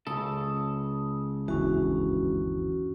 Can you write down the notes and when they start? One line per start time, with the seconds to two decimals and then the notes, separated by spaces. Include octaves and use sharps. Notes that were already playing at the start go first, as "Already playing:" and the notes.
0.07 C#2 C#3 A4 D#6
1.48 G1 D#2 E3 C#4 F#4